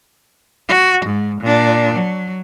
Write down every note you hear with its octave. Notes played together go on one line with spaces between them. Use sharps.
F#4
G#2
A#2 D4
F#3